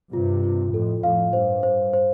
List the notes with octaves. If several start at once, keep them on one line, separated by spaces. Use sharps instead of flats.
G2 C3 F4
F4
F2 A2 A4
F2 A2 F5
G2 C5
C5
C5